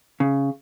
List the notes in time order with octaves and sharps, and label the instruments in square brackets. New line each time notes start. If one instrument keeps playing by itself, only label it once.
[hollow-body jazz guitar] C#3